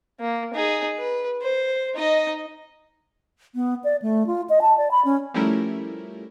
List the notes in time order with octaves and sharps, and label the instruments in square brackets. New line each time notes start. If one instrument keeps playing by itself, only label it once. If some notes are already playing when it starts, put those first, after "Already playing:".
[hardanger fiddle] A#3
D#4 G#4
B4
C5
D#4 D#5
[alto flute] B3
D5
A3
F4
D#5
A5
D5
B5
C#4
[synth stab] F3 G3 A3 C#4 E4 A#4